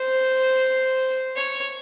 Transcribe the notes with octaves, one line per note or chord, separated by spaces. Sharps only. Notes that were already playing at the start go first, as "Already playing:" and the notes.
Already playing: C5
C#5